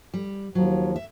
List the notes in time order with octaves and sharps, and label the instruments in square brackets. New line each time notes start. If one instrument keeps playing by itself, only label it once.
[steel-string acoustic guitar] G3
[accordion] D#2 F3 [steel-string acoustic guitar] F#3
[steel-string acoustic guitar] E5